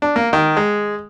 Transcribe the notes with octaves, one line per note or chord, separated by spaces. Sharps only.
D4
A#3
D#3
G#3